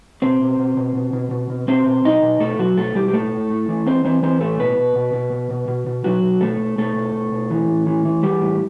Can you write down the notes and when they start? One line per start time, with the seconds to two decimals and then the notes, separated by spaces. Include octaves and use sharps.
0.22 B2 C4 C5
0.41 B2
0.59 B2
0.77 B2
0.95 B2
1.13 B2
1.31 B2
1.50 B2
1.68 B2 C4 C5
1.86 B2
2.05 B2 D#4 D#5
2.22 B2
2.40 B2 A3 A4
2.59 B2 F#3 F#4
2.77 B2 A3 A4
2.95 B2 G3 G4
3.08 G4
3.13 A2 A3 A4
3.31 A2
3.50 A2
3.68 E3
3.87 E3 C4 C5
4.05 E3 C4 C5
4.23 E3 C4 C5
4.41 A2 A3 A4
4.59 B2 B3 B4
4.78 B2
4.96 B2
5.13 B2
5.32 B2
5.51 B2
5.68 B2
5.87 B2
6.04 B2 F#3 F#4
6.23 B2
6.41 B2 A3 A4
6.60 B2
6.78 B2 A3 A4
6.96 B2
7.15 B2
7.32 B2
7.51 E3
7.69 A2
7.87 E3
8.05 E3
8.23 E3 G3 G4
8.41 A2